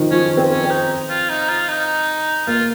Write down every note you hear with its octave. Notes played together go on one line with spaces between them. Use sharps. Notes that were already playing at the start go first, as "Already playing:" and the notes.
Already playing: D#3 F3 D#4
F3 C#4
C4
C#4
C4
D#4
F4
D#4
F4
D#4
A#3 F4